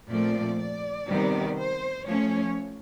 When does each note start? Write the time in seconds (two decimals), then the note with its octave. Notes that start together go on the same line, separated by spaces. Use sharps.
0.09 A#2 F3 A3 C4 D5
0.59 D5
1.08 C3 D#3 G3 B3
1.58 C5
2.06 F3 A3 C#4 C#5